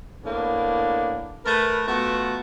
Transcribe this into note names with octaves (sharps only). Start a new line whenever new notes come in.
A2 A#3 B3 D4
A3 A#4 B4
A3 B3 F4 F#4